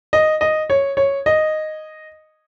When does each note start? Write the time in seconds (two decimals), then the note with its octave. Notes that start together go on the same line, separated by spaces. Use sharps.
0.13 D#5
0.41 D#5
0.70 C#5
0.97 C#5
1.26 D#5